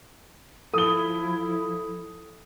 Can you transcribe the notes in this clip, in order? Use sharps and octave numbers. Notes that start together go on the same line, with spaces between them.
F3 E4 A4 D#6 G7